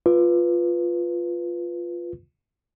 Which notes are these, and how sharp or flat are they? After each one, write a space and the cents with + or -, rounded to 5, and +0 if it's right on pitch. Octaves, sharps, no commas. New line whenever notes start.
F4 +0 B4 +0